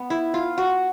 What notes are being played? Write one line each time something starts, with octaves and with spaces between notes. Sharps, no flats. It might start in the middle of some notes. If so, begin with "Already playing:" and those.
Already playing: B3
E4
F4
F#4